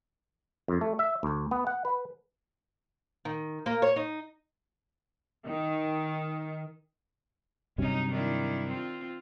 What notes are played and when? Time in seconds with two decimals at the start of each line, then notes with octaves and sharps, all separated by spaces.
0.68 F2
0.81 A3
0.99 E5
1.23 D2
1.51 B3
1.67 F#5
1.85 B4
3.25 D#3
3.66 A#3
3.82 C#5
3.96 D#4
5.47 D#3
7.78 G2 C3 F#3 C#4 D#4
8.10 D#3 D4 E4
8.68 C4 F4